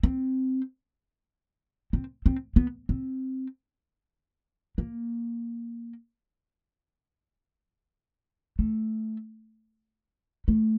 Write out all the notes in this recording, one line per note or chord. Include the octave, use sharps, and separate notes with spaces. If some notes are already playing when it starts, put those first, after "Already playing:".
C4
C4
C4
B3
C4
A#3
A3
A3